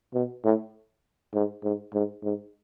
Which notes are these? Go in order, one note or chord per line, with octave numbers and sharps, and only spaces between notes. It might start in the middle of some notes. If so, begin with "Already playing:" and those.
B2
A2
G#2
G#2
G#2
G#2